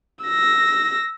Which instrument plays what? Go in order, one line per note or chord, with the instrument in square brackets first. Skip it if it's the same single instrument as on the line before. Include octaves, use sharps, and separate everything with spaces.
[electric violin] E6 A#6